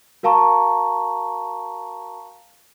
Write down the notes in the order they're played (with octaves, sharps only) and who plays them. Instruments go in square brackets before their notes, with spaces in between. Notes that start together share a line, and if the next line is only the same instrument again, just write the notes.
[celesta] F#4 A#4 F5 A5 A#5 C#6